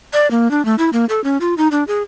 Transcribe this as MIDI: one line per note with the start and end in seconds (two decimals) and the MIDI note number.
0.13 0.29 74
0.31 0.50 58
0.51 0.64 62
0.65 0.75 57
0.78 0.90 64
0.93 1.05 58
1.09 1.23 69
1.24 1.37 61
1.41 1.54 65
1.58 1.68 63
1.71 1.84 62
1.88 2.02 68